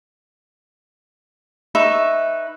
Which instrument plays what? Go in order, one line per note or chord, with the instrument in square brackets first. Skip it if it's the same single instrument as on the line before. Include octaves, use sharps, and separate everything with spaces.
[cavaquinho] D#4 B4 E5 C#6